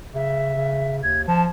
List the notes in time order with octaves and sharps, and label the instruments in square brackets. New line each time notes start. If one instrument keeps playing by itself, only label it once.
[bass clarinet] C#3 [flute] E5
[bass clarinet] C#3
[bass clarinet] D#2 [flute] G#6
[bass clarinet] F3 [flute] A5